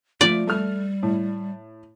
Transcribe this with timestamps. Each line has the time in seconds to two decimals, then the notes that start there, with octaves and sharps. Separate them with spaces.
0.21 F3 A3 D5
0.47 G3 A3 F6
1.03 A2